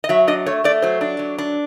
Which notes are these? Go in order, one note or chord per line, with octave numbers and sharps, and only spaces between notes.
D#5
F#3 E5
D4 D#5
A3 C#5
A3 D5
F#3 C5
D4
F#3
D4